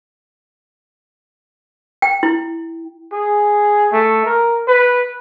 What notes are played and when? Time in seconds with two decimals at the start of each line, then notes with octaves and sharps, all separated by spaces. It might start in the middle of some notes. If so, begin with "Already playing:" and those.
2.02 G5
2.23 E4
3.12 G#4
3.92 A3
4.25 A#4
4.67 B4